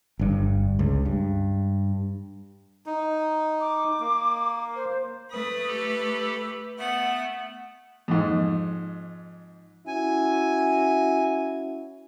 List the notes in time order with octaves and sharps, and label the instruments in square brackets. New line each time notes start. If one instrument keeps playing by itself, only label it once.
[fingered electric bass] G1 G2
C#2
G2
[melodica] D#4
[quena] D6
[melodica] A#3
[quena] C5
[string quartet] A3 B4 [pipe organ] D#6
[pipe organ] G4 A4
[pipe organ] A3 B3 [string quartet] F#5
[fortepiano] F2 G#2
[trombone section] C#4 E4 F#4 [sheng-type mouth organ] G#5